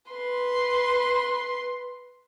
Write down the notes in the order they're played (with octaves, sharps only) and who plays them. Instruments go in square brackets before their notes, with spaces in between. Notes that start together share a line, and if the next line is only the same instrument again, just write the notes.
[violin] B4 C6